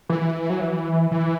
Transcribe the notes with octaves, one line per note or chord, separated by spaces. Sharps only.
E3
F#3
E3
E3